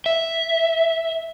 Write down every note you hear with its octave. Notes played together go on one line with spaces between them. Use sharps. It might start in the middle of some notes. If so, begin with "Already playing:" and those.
E5